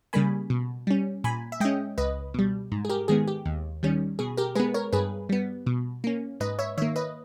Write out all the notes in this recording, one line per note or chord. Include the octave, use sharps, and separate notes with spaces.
C#3 G3 A#3 G#5 B5
B2
G3 C#4
A#2 G#5 B5
E5
G#3 C#4 D#5 G5
C#2 B4 D#5
B2 G3
G#2
G#4
G4 A#4
D#3 G#3 B3 G#4
G4
D#2
D#3 G3 C#4
B2 G#4
G4 A#4
G#3 B3 G#4 B4
A#4 C#5
G2 G#4 B4
G3 B3
B2
A#3 C#4
G#2 B4 D#5
C#5 E5
D#3 A#3 C#5 E5
B4 D#5